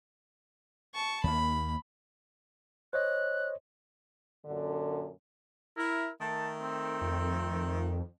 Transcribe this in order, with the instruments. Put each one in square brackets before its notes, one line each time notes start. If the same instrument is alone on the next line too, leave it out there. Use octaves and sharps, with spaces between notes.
[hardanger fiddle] A5 C#6
[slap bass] D#2 A#3 [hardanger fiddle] B5
[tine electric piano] C5 C#5 D#5 [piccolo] F#6
[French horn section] F#2 A#2 D3
[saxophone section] E4 [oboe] A#4
[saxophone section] D#3 A3 [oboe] A5
[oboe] C4
[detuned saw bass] F2